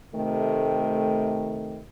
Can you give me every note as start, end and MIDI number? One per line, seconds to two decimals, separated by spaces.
0.14 1.82 48
0.14 1.82 51
0.14 1.82 57